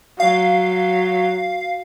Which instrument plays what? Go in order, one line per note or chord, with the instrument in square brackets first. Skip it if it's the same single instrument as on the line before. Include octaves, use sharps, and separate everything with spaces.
[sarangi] F#3 [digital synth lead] F5